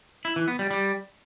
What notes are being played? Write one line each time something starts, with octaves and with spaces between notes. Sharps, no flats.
E4
E3
B3
G3
G3